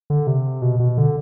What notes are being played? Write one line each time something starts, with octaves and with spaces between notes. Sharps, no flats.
D3
C3
B2
B2
D3